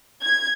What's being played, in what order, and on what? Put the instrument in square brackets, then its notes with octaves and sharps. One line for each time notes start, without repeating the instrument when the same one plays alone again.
[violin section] G#6